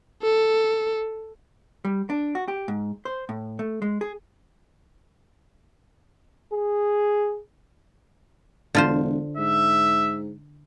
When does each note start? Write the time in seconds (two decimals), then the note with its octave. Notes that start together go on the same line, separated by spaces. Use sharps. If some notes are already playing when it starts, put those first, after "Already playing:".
0.22 A4
1.85 G3
2.10 D4
2.35 F#4
2.48 G4
2.68 G#2
3.05 C5
3.29 A2
3.59 A3
3.82 G#3
4.01 G#4
6.53 G#4
8.75 E1 D3 F4 C5
9.38 G#2 E5